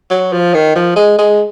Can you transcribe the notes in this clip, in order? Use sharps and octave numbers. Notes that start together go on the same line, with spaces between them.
F#3
F3
D#3
F3
G#3
G#3